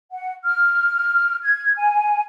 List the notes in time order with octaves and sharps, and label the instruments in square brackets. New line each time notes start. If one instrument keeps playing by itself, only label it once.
[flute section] F#5
F6
G#6
G#5